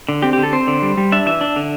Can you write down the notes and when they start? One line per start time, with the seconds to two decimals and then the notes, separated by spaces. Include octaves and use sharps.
0.09 D3
0.22 C4 G4
0.33 D3 G4
0.43 A4
0.53 C4 C5
0.67 D3
0.82 G3
0.98 G3
1.12 D4 E5
1.26 E3 E5
1.41 D4
1.56 D3